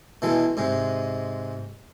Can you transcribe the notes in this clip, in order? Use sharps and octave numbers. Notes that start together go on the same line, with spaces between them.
B2 E3 G#3 A4
G#2 C3 G#3